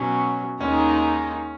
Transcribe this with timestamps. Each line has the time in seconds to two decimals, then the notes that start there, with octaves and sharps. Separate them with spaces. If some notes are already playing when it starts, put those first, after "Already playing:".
Already playing: B2 F#3 C#4
0.61 D#2 D#3 G#3 C#4 D#4